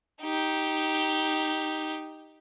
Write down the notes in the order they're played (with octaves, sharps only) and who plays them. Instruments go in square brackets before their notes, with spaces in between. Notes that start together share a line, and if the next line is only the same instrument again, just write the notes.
[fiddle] D#4 G4